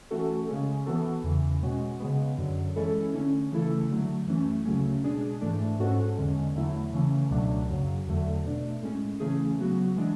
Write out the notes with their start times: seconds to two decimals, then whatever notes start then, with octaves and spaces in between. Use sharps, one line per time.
0.11 E3 A3 C#4 F#4 A4
0.48 C#3 G#3 C#4 G#4
0.86 E3 B3 F#4 A4
1.24 E2 C#3 E3
1.62 B2 G#3 C#4 F#4
2.00 C#3 G#3 B3
2.38 F#2 D3 F#3
2.76 E3 G#3 C#4 E4 A4
3.14 D3 A3 C#4
3.51 C#3 E3 A3 E4 A4
3.90 D3 F#3 A3
4.27 F#2 E3 A3 C#4
4.65 D2 C#3 F#3 A3 C#4
5.03 B2 G#3 D4 G#4
5.41 G#2 E3 A3 D4
5.79 G#2 G#3 C#4 F#4 A4
6.17 E2 D3 G#3 C#4
6.55 E2 D3 F#3 A3 E4
6.93 C#3 E3 A3 C#4
7.30 C#2 B2 F#3 A3 D4
7.68 F#2 C#3 F#3
8.06 E2 D3 F#3 A3
8.45 B2 A3 D4
8.82 A2 G#3 C#4
9.20 C#3 E3 A3 C#4 G#4
9.58 C#3 F#3 B3 F#4
9.96 E3 G#3 D4